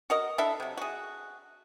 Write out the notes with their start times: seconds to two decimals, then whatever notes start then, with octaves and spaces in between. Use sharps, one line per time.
0.10 F#4 A#4 D#5
0.38 D4 E4 A4 E5
0.60 C3 F#3
0.77 F#4 G#4